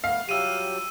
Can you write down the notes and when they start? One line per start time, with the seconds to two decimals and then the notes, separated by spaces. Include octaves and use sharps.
0.04 A3 B3 F5
0.29 F#3 G3 F4 G4 E5 E6 D#7